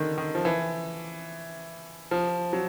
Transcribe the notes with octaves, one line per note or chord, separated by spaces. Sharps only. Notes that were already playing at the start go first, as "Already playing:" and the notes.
Already playing: D3 D#3
D#3
F3
E3
F3
F#3